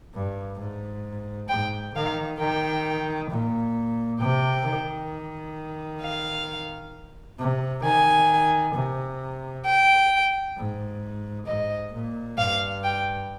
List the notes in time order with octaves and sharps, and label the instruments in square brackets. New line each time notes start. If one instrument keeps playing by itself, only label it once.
[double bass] G2
G#2
[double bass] G#2 [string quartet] G5
[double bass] D#3 [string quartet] F5
[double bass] D#3 [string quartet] G5
[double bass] A#2
[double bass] C3 [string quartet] G5
[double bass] D#3
[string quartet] F5
[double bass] C3
[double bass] D#3 [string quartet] G#5
[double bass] C3
[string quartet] G5
[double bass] G#2
[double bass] G#2 [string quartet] D#5
[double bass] A#2
[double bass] G2 [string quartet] F5
[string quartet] G5